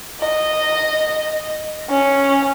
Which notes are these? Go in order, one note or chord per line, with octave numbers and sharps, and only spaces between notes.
D#5
C#4